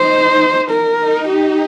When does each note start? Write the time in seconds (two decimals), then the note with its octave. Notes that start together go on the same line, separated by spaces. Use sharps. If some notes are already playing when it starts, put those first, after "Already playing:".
Already playing: D#4 C5
0.71 A#4
0.99 D#4
1.28 G4